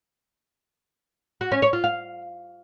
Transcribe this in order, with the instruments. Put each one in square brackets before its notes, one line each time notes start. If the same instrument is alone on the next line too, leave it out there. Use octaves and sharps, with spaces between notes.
[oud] F#4
C#4
C#5
F4
F5